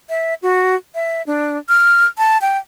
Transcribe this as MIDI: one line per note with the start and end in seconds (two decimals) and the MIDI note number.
0.09 0.34 76
0.42 0.75 66
0.95 1.22 76
1.27 1.58 62
1.69 2.06 89
2.18 2.40 81
2.41 2.58 79